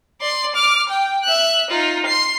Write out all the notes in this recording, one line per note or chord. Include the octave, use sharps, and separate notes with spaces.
D5 C6
D6 F6
G5
E5 F#6
D#4 F4
C6 C7